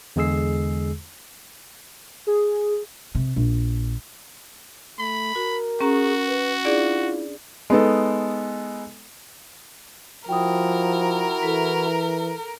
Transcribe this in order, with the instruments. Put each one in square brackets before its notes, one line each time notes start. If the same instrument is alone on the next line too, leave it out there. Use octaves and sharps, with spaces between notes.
[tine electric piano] E2 D3 G#3 G#4 E6 C7
[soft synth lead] G#4
[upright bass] C3
A#1
[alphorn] A3 [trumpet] B5
[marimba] F#4 [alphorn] A#4
[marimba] C#4 A#5 [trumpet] F#4 [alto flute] G#4
[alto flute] B4
[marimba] D4 G#4 D5 [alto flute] E4 [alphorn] F4
[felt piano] G#3 B3 D#4 A4
[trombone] F3 [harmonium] E4 F#4 [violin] A#4 [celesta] G5 D#6
[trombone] E3 [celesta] A4 B6